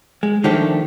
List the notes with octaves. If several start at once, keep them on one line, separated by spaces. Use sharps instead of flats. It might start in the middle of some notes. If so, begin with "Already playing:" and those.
G#3
D#3 F3 A3 D4 G4